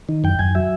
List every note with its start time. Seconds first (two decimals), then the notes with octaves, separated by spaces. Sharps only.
0.09 D#3
0.24 F#2 G5
0.39 F#2 G#5
0.55 F#3 E5